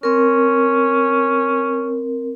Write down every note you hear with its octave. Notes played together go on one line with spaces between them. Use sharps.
C4 C#4 A#4